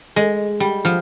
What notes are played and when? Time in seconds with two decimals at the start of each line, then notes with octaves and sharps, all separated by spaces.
0.16 G#3
0.60 G3
0.85 F3